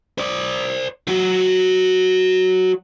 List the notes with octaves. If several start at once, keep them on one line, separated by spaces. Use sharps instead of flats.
C5 D5
F#3 F#4